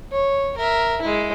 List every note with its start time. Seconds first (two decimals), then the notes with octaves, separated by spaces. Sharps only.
0.12 C#5
0.57 A#4 E5
1.01 G#3 E4